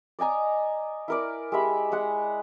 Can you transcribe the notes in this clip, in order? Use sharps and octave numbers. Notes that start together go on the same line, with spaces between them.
D5 D#5 G#5 A#5
E4 A#4 D5
G#3 G4 E5 B5
G#3 F#5